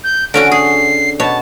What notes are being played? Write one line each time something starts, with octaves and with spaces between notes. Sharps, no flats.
G6
D3 C#4 F#4 D7
G#4 C7
B2 C#5 A5